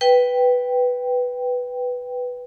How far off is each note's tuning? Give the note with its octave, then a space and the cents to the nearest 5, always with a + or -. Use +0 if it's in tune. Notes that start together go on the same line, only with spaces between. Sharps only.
B4 +0 G5 +0